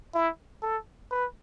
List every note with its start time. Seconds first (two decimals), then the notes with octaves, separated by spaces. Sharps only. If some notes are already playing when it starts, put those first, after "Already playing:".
0.15 E4
0.62 A4
1.11 B4